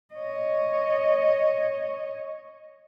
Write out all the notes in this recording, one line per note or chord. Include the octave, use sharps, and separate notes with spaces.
C#5 D#5